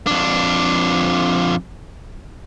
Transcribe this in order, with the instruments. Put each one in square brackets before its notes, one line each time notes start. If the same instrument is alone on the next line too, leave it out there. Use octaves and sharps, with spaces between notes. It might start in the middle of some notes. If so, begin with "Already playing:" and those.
[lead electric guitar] F2 D4